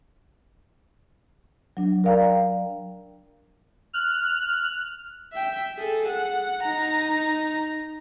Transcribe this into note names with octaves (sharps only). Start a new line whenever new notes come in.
F#3 D4
A#4 D5 F5 G5 A#5
F6 F#6
E5 G5
G#4 A4
F#5
D#4 A#5